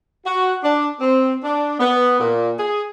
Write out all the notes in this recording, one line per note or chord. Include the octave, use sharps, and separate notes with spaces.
F#4
D4
C4
D4
B3
A#2
G#4